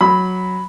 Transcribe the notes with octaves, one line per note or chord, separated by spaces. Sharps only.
F#3 B5